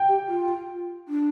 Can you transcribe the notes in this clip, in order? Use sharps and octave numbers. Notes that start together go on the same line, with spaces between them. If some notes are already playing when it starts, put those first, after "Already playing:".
Already playing: G5
G4
F4
D4